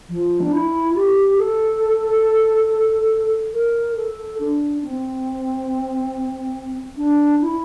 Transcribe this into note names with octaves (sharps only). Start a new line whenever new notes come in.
F3
D4
E4
G4
A4
A#4
A4
D4
C4
D4
E4